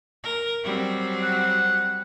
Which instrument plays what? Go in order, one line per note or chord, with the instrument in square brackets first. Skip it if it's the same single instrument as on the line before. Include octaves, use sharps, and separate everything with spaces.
[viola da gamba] A#4
F#3 G3 C4
[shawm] F#5